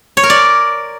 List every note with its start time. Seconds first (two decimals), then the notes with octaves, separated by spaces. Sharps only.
0.17 C#5
0.23 A#4
0.30 D5